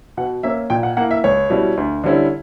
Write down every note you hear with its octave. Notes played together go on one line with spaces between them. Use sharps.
B2 F#5
A#3 C#4 E5
A#2 G5
F#5
A#3 E4 F#5
E5
C#2 C#5
B2 G3 C#4 E4
D2
D3 G3 C#4 E4